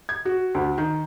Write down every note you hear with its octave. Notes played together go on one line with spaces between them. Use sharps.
G#6
F#4
D2
D#3